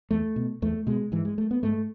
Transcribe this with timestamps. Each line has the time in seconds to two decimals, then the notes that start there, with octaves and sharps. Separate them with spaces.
0.11 E2 A3
0.36 B2
0.62 E2 A3
0.87 B2 G#3
1.12 G#2 E3
1.25 G#3
1.38 A3
1.51 B3
1.63 G#2 A3